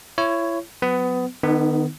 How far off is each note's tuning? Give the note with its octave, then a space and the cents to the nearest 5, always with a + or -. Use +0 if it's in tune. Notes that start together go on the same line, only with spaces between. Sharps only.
E4 +30 C#5 +0
F#3 -20 B3 +25
D#3 -35 B3 +15 D#4 +10